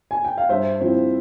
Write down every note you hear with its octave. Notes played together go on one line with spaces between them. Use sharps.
G#5
G5
F5
G2 C5 E5
F3 C4 E4